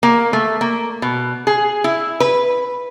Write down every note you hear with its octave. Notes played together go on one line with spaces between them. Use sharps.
A#3
A3
A#3
B2
G#4
E4
B4